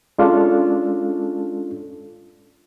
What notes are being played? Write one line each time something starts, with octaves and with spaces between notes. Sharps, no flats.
G#3 C#4 D4 F4 A4